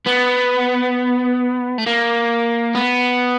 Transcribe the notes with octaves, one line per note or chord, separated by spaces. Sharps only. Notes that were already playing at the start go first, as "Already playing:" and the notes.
B3
A3
A#3
B3